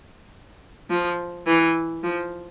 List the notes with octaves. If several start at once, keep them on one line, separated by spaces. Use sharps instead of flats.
F3
E3
F3